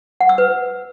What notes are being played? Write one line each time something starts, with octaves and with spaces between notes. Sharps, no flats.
F#5
E6
B4